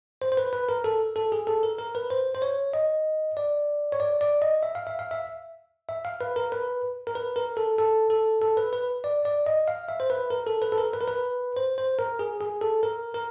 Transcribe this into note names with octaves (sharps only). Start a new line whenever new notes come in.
C5
C5
B4
B4
A#4
A4
A4
G#4
A4
A#4
A#4
B4
C5
C5
C#5
D#5
D5
C#5
D5
D5
D#5
E5
F5
E5
F5
E5
E5
F5
B4
A#4
B4
A#4
B4
A#4
A4
A4
A4
A4
B4
B4
D5
D5
D#5
F5
E5
C5
B4
A#4
A4
B4
A4
A#4
B4
A#4
B4
C5
C5
A#4
G#4
G#4
A4
A#4
A#4